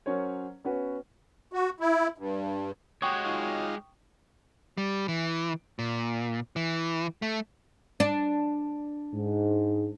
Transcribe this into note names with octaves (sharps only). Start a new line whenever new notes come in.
F#3 C#4 A#4 C5 C#5
B3 C#4 F#4 B4
F#4
E4
G2
G#3 F#4 G4 C#5 G5 C#6 D#6
D#4 F4
G3
E3
A#2
E3
A3
D4
G#2